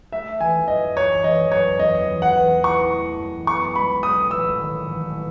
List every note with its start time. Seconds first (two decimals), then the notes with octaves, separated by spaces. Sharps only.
0.12 A3 E5
0.40 E3 G#5
0.68 F#2 D#5
0.96 F#2 C#5
1.24 E3 D#5
1.52 F#2 C#5
1.80 E2 D#5
2.08 E3
2.22 F#5
2.36 E2
2.64 E4 C#6
2.91 A3
3.19 F#2
3.47 B3 C#6
3.75 G#3 B5
4.03 B1 D#6
4.30 A1 E6
4.59 D#3
4.86 A1
5.14 E4